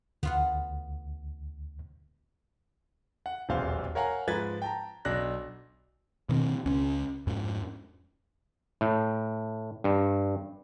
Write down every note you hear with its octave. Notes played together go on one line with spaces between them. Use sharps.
D2 B3 F4 F#5
F#5
D#1 B1 E2 C5 F5
A#4 C#5 F5 F#5 G#5 A#5
G#2 F3 B4 G#6 A6
G5 A5 A#5
B1 D4 F#6 A#6
B2 D#3 C4
C#2 C#4
F2 G#2
A2
G2